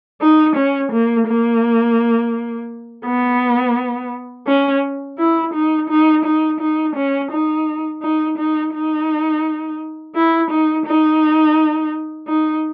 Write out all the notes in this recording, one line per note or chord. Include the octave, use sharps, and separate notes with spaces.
D#4
C#4
A#3
A#3
B3
C#4
E4
D#4
D#4
D#4
D#4
C#4
D#4
D#4
D#4
D#4
E4
D#4
D#4
D#4